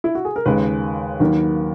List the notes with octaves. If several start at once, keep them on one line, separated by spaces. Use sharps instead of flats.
E4
F#4
G#4
A#4
D#2 C#3 G#3 B4
D#2 D#3 F#3 A#3